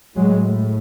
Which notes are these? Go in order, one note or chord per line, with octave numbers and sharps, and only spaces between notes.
A2 F#3 G#3